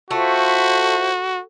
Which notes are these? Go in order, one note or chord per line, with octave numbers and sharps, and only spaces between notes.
A3 F4 F#4 C5 E5